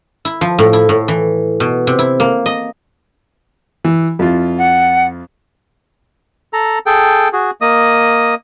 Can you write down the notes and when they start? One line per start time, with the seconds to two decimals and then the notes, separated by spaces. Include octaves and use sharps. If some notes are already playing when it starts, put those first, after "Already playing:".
0.25 E4
0.41 F3
0.59 A2
0.73 E4
0.89 A2
1.08 E3
1.60 B2
1.87 C3
1.99 E4
2.20 A#3
2.46 D#5
3.84 E3
4.19 F2 E4 F4
4.58 F#5
6.53 A4 A#5
6.86 G#4 A4 G5
7.33 F#4 G#4
7.61 A#3 D#5 D#6